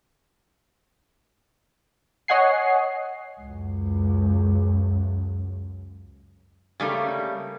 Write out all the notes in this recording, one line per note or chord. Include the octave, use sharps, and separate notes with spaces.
C#5 D#5 F#5 G#5 C7
C#2 F#2
C#3 G3 A3 A#3